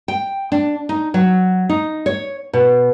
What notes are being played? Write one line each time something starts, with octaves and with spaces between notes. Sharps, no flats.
G5
D4
D#4
F#3
D#4
C#5
B2